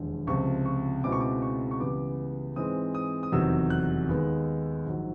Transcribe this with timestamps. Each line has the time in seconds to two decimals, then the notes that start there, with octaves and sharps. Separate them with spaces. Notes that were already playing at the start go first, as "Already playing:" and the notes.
Already playing: E1 D#2 D3 F3 G#3
0.27 C#2 C3 F3 C#6
0.66 C#6
1.03 C#2 B2 G#3 C4 E4 D6
1.12 C#6
1.20 D6
1.42 C#6
1.71 C#6
1.80 C#2 C#3 E3 G3 B3 D6
2.56 G#2 E3 G#3 C4 D#6
2.94 D#6
3.23 D#6
3.32 F1 E2 C3 D#3 F#3 E6
3.70 F#6
4.09 D#2 D#3 G#3 B3
4.85 A#1 G#2 D#3 F#3